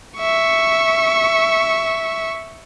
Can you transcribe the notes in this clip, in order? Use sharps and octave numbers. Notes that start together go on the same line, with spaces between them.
E5 C#6